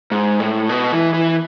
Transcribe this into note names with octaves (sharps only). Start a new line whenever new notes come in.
G#2
A2
B2
E3
E3